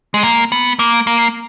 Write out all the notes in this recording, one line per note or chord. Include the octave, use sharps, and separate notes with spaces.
G#3
A#3
B3
A#3
A#3